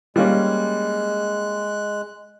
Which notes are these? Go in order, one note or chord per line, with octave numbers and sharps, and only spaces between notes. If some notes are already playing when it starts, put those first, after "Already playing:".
G3 G#3 A#3 C#4 F#6